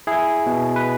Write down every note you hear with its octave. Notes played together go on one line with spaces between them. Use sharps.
E4 G#4
B2
B4